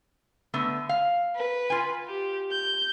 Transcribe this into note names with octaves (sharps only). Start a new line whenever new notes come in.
D3 A3 B3
F5
B4
F4 G#5
G4
G6